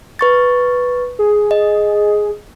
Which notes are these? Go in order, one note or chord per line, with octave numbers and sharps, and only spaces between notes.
B4 C#6 A6
G#4
D#5